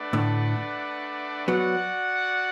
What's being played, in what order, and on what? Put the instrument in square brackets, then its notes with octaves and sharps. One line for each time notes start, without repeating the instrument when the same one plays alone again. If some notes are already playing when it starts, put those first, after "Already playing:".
Already playing: [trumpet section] A3 D4 B4 D5 F#5
[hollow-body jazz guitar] A2 D3
[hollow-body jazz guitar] F#3 B3 [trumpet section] F#4 D5 F#5